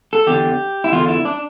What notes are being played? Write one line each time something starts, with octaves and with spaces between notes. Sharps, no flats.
A4
E2 D3 G4
E4
E2 D3 F4
E4
D4